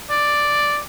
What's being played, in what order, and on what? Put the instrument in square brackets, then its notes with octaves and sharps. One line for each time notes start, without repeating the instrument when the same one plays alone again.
[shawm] D5